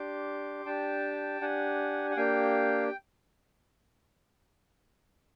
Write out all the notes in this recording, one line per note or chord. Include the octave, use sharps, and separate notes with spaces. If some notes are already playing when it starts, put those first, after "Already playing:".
Already playing: D4 G4 C6 D6
D4 G4 G5 A5
D4 G4 F#5 G#5
F#5
A#3 D4 G4 F5 G5